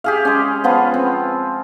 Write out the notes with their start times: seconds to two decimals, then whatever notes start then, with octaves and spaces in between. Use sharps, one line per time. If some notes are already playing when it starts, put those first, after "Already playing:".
0.04 G4 G#4 F5
0.25 G#3 C#4
0.64 F3 B3 F4
0.94 C4